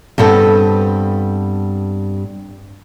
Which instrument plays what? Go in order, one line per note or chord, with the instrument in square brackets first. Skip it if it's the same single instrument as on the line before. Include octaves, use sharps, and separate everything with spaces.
[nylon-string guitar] G2 B3 C4 A4